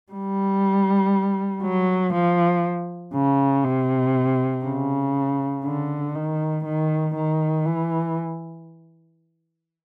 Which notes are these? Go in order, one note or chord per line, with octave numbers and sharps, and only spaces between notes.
G3
F#3
F3
C#3
C3
C#3
D3
D#3
D#3
D#3
E3